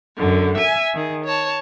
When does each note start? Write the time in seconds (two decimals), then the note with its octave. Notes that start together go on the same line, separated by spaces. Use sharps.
0.16 F#2 D3
0.56 E5 G#5
0.94 D#3 G#4
1.24 C#5 A5